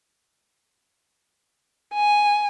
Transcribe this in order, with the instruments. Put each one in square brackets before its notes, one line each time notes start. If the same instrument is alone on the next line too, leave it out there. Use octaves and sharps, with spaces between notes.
[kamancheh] G#5